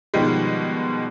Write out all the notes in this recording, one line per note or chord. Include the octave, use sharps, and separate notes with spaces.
B2 D#3 F3 G3 G#3